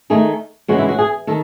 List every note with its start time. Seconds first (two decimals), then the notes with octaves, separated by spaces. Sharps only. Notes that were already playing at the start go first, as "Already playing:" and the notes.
0.10 D#3 A3 D#4 G#4
0.68 C#3 E3 G#3 B3 F#4
0.79 E4
0.88 F#4
0.98 G#4
1.27 D#3 A4